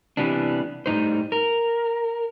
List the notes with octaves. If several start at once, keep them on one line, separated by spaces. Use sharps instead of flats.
C3 E3 G3 B3 D4
A2 G3 D#4 C5
A#4